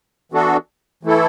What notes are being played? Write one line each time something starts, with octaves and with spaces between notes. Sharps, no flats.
E3 B3 D4 F#4 A4
E3 A3 E4 A4